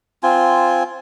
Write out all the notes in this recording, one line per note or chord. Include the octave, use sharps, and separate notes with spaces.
C4 F4 G#5